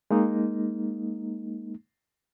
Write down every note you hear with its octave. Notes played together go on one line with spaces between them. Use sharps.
G#3 A#3 D#4